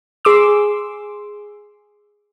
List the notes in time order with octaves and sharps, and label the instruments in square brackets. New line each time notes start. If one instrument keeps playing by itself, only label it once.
[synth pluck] G#4 C6 D6 E6